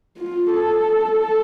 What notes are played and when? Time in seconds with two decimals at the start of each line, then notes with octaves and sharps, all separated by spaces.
0.18 F4
0.53 A4